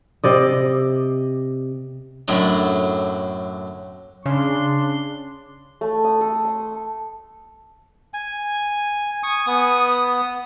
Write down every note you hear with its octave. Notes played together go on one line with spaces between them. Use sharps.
C3 D5 D#5
F#2 A2 D3 F#3 D4
C#3 D4 C6
A3
D#6
A4
C6
G#5
G#5 C#6 D#6
B3 D#6